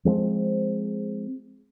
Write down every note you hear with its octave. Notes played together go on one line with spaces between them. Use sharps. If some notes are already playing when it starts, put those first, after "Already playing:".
F3 G#3 A3 C4